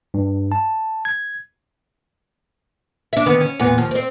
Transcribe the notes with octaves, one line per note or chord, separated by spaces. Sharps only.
G2
A5
G#6
D4 E5
D3 D#3 B3
C#4
E2 A#2 B3
D#2 F3
C4 C5